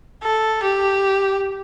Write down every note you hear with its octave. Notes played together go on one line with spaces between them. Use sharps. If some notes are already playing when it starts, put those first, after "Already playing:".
A4
G4